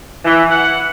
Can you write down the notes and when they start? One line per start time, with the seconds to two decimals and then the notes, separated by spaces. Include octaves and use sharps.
0.25 E3
0.50 F#5